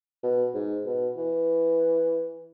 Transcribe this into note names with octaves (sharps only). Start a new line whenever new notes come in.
B2
G#2
B2
E3